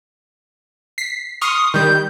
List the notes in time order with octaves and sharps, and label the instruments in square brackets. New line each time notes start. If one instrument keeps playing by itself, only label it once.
[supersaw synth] B6 C7
[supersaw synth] C6 C#6 F6 [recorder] D#6
[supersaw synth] D#3 G3 [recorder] G6